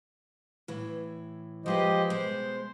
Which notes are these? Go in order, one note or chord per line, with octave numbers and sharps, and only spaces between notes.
A2 E3
F3 G#3 G4 B4 C5 D#5
B2 G#3 C5